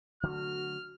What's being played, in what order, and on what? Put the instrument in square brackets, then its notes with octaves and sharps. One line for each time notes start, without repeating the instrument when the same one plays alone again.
[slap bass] D3 F#3 A3 [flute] F#4 [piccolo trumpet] F6